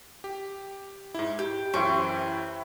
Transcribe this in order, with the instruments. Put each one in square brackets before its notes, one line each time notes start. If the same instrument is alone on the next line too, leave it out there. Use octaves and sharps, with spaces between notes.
[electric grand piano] G4
G#2 E4
[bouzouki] G4 [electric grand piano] G6
[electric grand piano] F#2 E3 [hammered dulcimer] E4 C5 C#6 [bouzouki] G5